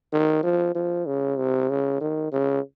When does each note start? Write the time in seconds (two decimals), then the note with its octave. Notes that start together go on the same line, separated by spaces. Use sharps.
0.13 D#3
0.43 F3
0.75 F3
1.07 C#3
1.38 C3
1.70 C#3
2.01 D#3
2.32 C#3